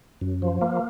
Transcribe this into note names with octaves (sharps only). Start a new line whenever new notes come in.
F#2
F3
A#3